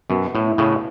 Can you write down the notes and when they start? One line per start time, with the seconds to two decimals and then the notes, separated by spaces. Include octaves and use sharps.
0.10 F#2 B2
0.35 A2
0.46 E4
0.58 A2 C#3